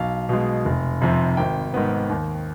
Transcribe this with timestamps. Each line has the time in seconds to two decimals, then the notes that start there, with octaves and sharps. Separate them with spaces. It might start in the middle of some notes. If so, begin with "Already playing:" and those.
Already playing: B1 F5
0.29 B2 G#3
0.65 F1
1.02 F2 C3
1.37 G#1 G5
1.74 G#2 D#3 B3
2.09 D#2